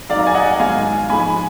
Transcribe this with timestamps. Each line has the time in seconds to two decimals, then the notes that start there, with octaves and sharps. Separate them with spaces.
0.09 F2 D#3 F#3 D5 F5
0.19 A#5
0.27 G#5
0.34 D#5 F#5
0.59 G#2 D#3 F#3 F5 G#5
1.10 G#2 F3 G#5 B5